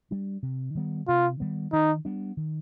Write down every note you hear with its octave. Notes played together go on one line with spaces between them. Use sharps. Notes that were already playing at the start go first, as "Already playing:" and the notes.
G3 D4
C3
D#3 G3 B3
C3 F4
D#3 G3 B3
D#3 D#4
G3 B3 D4
D#3